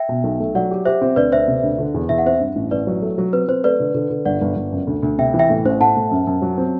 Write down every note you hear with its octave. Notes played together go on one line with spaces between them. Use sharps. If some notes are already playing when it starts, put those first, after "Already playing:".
Already playing: E5 G5
B2
B1
A3
F#3 D5 F#5
G4
G4 C5 E5
C4
D2 B4 D5
D2 C5 E5
C3
D2
D3
E2
E2 E5
F#5
C4 C5 E5
G2
A1
A1 B4 D5
F#3
A3
F#3
C4 B4
C4 C5
A3 B4 D5
D3
D3
D3
G1 D5 F#5
G1
G1
F#2
D2
D2
C3 E5 G5
E3
E5 G5
A2
A1 C5
A2 F#5 A5
A2
F#2
F#2
F#3
C4